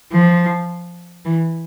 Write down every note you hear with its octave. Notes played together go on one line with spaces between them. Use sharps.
F3
E3